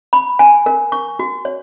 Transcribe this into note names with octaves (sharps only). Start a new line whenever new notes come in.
B5
G#5
A#4
C#6
F#4
C#5